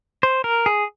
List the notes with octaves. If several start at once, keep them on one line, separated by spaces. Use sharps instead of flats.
C5
A#4
G#4